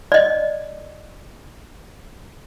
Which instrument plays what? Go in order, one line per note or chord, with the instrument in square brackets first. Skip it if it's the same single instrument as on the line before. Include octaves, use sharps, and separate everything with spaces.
[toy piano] D5 D#5